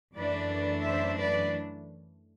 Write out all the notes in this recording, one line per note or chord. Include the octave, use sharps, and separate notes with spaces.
F#2 E3 A3 D4 B4 D5
C5 E5
B4 D5